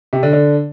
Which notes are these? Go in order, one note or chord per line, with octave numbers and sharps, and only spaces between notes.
C3
D3
D3